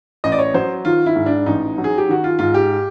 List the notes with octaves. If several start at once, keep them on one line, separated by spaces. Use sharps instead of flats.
A1 D#5
D5
C#5
F#3 C5
D#3 F4
E4
G#2
D4
A1 D#4
F#3
G#4
G4
D#3 F#4
F4
G#2 F4
G4